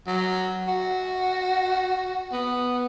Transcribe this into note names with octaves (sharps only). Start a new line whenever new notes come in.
F#3
F#4
B3